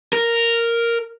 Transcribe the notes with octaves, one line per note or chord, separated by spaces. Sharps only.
A#4